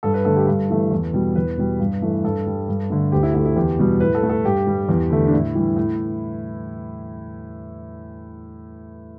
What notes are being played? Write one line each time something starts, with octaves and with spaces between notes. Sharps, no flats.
G2 A4
B4
D3 A3 A4
G4
G2 A4
E3 A3
E2
B2 G3
E2 B4
B2 G3
G2
E3 A3
G2 A4
G3
G2
D3 A3
D2 G4
E4
D3 A3 E4
E4
E2 G4
B2 G3
A2 B4
A4
A3
A4
G2 G4
G3
E2
D3 A3
D4
A2 E4
E3 G3
A2